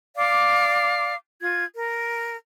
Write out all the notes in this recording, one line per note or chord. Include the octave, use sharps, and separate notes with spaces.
D5 F5 D6
F4 G#6
A#4